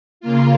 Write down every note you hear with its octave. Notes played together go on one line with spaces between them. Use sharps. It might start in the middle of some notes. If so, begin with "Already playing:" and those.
C#3 A#3 F4